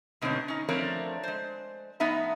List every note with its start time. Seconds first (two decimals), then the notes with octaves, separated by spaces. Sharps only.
0.22 G#2 B2 D3 A3 C4 C#5
0.48 C#4 D#4
0.69 F3 A3 C4 D4 A#4 C#5
1.23 G#3 C5
2.00 A2 F3 B3 D#4 E5 A#5